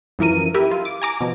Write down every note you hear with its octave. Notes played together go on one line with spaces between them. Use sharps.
F#2 E3 F3 A#4 D#7
E4 G4 A#4
F4
D6
G#5 A#5 D6
B2 F3